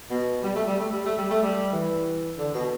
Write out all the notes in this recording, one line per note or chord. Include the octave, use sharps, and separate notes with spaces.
B2
G3
A3
G3
A3
G3
A3
G3
A3
G3
E3
D3
B2